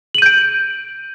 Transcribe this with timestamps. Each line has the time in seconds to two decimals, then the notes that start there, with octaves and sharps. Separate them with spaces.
0.15 F#7
0.18 D#7
0.22 G6
0.26 D7